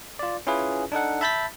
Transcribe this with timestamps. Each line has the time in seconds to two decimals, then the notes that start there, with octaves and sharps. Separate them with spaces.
0.19 F4 D5
0.47 C#4 E4 F4 G#4 B4
0.92 D4 D#4 A4 F#5
1.21 E5 A5 B5 G6 A6 B6